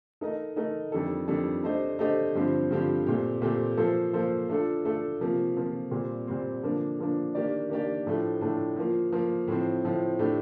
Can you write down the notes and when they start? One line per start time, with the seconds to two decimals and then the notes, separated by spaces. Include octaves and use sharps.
0.21 A3 D#4 A#4 D#5
0.56 A3 D#4 A#4 D#5
0.92 F2 D#3 G3 D4 A4
1.28 F2 D#3 G3 D4 A4
1.63 A3 D4 G4 C5 D#5
1.99 A3 D4 G4 C5 D#5
2.35 G2 D3 F3 C4 G4
2.70 G2 D3 F3 C4 G4
3.06 A#2 A3 C4 G4
3.42 A#2 A3 C4 G4
3.78 F3 A#3 F4 A4 C5
4.13 F3 A#3 F4 A4 C5
4.49 A3 D4 F4 A4
4.85 A3 D4 F4 A4
5.21 C3 F3 A#3 F4
5.56 C3 F3 A#3 F4
5.91 A#2 G3 C4
6.27 A#2 G3 C4
6.62 D3 F3 A#3 D4
6.99 D3 F3 A#3 D4
7.35 D#3 A#3 D4 G4 D5
7.69 D#3 A#3 D4 G4 D5
8.06 A2 F3 A3 D4
8.41 A2 F3 A3 D4
8.76 F3 A#3 F4
9.12 F3 A#3 F4
9.48 A2 F3 C4
9.85 A2 F3 C4
10.19 A2 A3 D4 G4